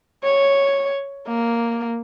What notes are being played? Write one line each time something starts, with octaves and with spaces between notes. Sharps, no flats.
C#5
A#3